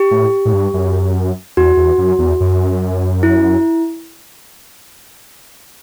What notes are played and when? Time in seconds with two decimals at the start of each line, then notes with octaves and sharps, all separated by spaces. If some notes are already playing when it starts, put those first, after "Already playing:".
Already playing: G4
0.11 A2
0.45 A2
0.53 G2
0.74 F#2
1.57 E2 F#4
1.77 E2
1.98 F#2
2.19 E2
2.40 F#2
3.23 E4